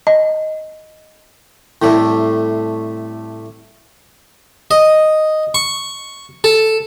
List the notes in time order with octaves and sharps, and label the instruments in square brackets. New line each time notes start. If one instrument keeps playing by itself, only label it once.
[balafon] D#5
[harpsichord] A2 C3 G3 A3
D#5
C#6
A4